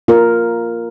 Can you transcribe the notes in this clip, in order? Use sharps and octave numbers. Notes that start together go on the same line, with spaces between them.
A#3 F4 A#4